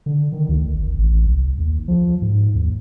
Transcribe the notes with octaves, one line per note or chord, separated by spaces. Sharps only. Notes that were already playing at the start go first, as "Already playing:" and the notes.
D3
D#3
D2
G1
A1
C2
D#2
F3
G#2
D#2